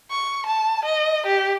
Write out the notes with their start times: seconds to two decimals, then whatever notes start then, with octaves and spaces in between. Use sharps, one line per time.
0.10 C#6
0.47 A5
0.86 D#5
1.27 G4